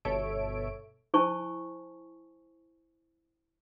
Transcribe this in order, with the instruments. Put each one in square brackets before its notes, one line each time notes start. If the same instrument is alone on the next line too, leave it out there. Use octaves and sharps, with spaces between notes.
[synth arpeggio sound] G1 B2 A4 C#5 E5 D7
[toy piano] E4 C5 G#5 A5 C#6